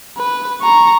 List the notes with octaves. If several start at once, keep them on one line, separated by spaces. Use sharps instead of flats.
B4
A#5 C#6